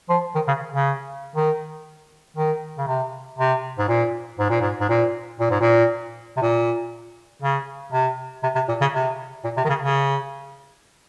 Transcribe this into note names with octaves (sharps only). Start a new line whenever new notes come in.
F3
D#3
C#3
C#3
D#3
D#3
C#3
C3
C3
G#2
A#2
G#2
A#2
G#2
G#2
A#2
A#2
G#2
A#2
C3
A#2
C#3
C3
C3
C3
A#2
C#3
C3
A#2
C3
D#3
C#3
C#3